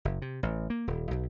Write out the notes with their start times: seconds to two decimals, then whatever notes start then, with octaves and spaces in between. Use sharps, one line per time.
0.05 F#1
0.22 C3
0.43 A1
0.70 A#3
0.87 D#1
1.11 B1